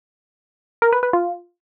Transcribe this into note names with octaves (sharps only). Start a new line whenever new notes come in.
A#4
B4
B4
F4